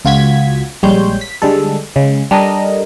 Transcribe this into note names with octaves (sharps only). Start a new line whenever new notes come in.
C#2 F4 F#4 G#6 B6
A#1 G3 G#3 C#5 C6 G6
B6
D3 G3 G#3 A4
C#3 G#3
G3 D4 A4 A#4 D#5